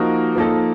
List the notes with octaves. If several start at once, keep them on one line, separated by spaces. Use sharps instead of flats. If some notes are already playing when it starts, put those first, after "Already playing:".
Already playing: F3 A#3 D#4 F#4 A#4
F3 A#3 D#4 A4